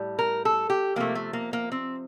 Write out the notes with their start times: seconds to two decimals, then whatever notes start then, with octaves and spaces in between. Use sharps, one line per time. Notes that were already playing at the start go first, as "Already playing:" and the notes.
Already playing: A2 G3
0.19 A#4
0.45 A4
0.70 G4
0.96 C3 F3 A3 A#3
1.15 A3
1.33 A#3
1.53 A#3
1.72 C4